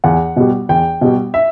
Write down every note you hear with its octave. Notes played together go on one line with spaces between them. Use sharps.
E2 F#5
B2 G3
E2 G5
B2 G3
E5